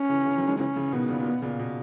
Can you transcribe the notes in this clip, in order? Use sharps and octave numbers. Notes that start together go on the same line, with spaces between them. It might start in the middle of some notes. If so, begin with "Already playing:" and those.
Already playing: C#4
C#3 E3
C#3 E3
D#3 F#3
E3 G#3
C#3 E3 C#4
C#3 E3
B2 D#3 B3
A#2 C#3
A#2
B2
A#2 C#3
B2